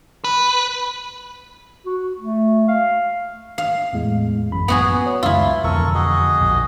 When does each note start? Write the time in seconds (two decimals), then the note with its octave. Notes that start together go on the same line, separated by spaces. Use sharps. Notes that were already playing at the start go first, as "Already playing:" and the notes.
0.24 B4
1.85 F#4
2.20 A3
2.68 F5
3.58 F5
3.93 E2 A2 G#3
4.52 A1 F#2 B5
4.68 B3 F#4 G#4
5.06 C#5
5.23 C#2 F#2 E4 F4 E6
5.64 E1 F2 D3 A4 A#4 C#6
5.95 F#4 G#4 D#5
6.41 A#1